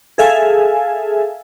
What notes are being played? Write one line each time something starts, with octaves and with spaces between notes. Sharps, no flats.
G#4 A4 E5 F5 G#5